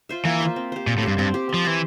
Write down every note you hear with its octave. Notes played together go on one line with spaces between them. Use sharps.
F4 C5 E5
E3 A#3
F4 C5 E5
C4
G4 C5
A#2 C4
A2
G2 G4 C5
G2 C4
G4 C5
F3 C4
E3 G4 C5